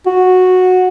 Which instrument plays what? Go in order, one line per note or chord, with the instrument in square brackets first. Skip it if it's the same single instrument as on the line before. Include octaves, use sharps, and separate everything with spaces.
[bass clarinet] F#4